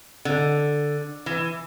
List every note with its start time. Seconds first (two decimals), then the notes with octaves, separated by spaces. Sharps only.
0.25 D3
1.26 E3